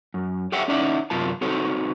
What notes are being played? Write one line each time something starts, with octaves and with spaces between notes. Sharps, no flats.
F#2
G4 A4 C#5 E5 F#5 G5
C#4 D#4 E4 D5 E5 F#5
F#2 C3 F4 A#4 A5
C4 D#4 F#4 A4 C#5